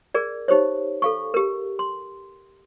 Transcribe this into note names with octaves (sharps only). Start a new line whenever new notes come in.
G#4 A#4 D5
D#4 G4 C5 C#5
A4 F5 C#6
G4 A#4
C6